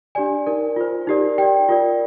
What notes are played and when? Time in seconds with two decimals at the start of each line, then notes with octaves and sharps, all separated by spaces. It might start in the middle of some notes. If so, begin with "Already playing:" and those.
0.15 D4 G4 D5 G#5
0.47 D#4 A#4 D5
0.76 F4 C5
1.07 D#4 G4 A#4 D5
1.38 G4 D5 G5
1.69 F4 A#4 D5